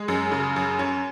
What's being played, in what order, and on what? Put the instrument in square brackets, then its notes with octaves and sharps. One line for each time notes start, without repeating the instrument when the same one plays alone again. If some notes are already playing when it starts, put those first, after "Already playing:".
Already playing: [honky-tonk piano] G#3
F#2
C#3
F#2
C#4